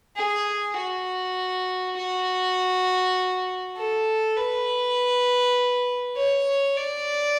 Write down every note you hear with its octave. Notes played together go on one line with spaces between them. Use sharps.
G#4
F#4
F#4
A4
B4
C#5
D5